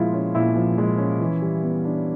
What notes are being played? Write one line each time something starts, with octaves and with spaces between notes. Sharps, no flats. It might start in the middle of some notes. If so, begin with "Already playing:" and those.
Already playing: A#2 F3 G#3 E4 F4
C#4
A#2 E4
F3
G#3
C#4
E3
G3
B3
D4